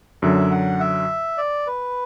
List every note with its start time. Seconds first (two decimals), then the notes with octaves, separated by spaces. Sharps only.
0.22 F#2 D3 F#3 E5
0.51 F#5
0.80 E5
1.38 D5
1.67 B4